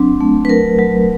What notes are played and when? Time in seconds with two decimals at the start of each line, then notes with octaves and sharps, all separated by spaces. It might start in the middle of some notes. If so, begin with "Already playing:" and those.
Already playing: F#3 C4 D4
0.21 A3
0.45 B4
0.49 F#3 A#4
0.79 F#3